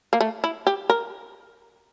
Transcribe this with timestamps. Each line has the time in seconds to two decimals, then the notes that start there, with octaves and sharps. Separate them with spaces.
0.13 A#3
0.20 A3
0.44 E4
0.67 G4
0.89 A#4